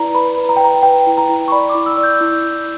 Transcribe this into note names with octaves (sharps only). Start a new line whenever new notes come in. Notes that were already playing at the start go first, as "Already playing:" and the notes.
Already playing: E4 B4 D5 A#5
B4 B5
B4
A#5
G5
B4 A#5
B4 G5
E4
A#5
E4
C#6
D5 B5
D6
E4
E6
D5
G6
E4
E4